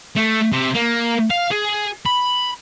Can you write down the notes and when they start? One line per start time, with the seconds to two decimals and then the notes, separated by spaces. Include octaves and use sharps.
0.16 A3
0.52 C3
0.75 A#3
1.30 F5
1.51 G#4
2.06 B5